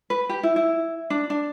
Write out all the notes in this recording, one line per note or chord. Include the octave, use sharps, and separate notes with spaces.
B4
G4
E4
E4
D4
D4